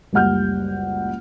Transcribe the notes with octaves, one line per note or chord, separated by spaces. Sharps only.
F#1 C#2 G3 F#5 F6 G6